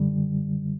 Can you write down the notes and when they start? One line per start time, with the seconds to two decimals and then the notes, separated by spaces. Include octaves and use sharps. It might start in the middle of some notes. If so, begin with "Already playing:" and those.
Already playing: F#2 D3 G3